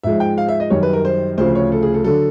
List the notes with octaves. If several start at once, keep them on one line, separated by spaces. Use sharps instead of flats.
G#2 F3 G#3 E5
G5
F5
E5
D#5
F#2 D#3 G3 C#5
B4
A#4
C5
D2 C#3 F3 C5
C#5
A4
G#4
A4
D3 F#3 A4